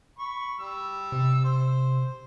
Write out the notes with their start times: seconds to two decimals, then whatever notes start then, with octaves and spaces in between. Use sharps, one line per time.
0.18 B5 C#6
0.60 G3 E6
1.12 C3
1.45 C5